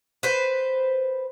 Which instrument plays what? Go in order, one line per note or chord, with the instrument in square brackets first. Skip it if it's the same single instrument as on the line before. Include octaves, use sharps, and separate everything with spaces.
[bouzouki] B4 C5